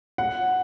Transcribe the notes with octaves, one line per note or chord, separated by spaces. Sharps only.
F#5